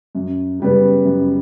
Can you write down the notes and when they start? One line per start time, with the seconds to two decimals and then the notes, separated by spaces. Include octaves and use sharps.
0.15 F#2
0.60 C#3 G3 B3
1.05 F#2